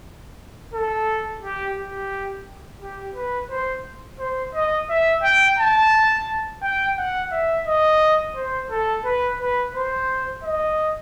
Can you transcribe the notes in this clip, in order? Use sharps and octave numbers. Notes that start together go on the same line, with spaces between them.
A4
G4
G4
G4
B4
C5
C5
D#5
E5
G5
A5
G5
F#5
E5
D#5
C5
A4
B4
B4
C5
D#5